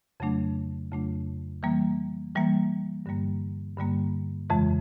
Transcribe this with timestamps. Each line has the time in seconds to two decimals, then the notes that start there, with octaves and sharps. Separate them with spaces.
0.20 F2 C#3 F#3 A3 D4
0.92 F2 C#3 F#3 A3 D4
1.63 E3 G3 A#3
2.35 E3 G3 A#3
3.06 G2 D3 G3 A#3
3.78 G2 D3 G3 A#3
4.50 F2 C#3 E3 G#3